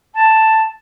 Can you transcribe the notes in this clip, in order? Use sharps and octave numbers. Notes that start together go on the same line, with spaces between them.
A5